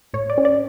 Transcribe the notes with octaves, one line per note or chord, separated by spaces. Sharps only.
A2 C#5
D5
C#4
D5